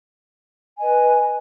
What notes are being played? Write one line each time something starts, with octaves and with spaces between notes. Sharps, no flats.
B4 D#5 G#5